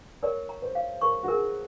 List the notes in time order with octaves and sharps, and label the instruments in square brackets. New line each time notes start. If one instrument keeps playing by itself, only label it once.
[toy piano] A#4 [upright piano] C#5
[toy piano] A#5
[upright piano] C5
[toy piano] F5
[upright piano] A#4 [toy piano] C#6
[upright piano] F#4
[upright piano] G#4 [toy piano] A#4